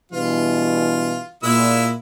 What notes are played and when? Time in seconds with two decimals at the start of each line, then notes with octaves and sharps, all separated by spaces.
0.12 G2 B2 E3 F4
1.43 A#2 G#3 E4 E6